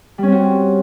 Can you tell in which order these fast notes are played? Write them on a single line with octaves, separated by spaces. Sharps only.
G3 C#4 C4 F#4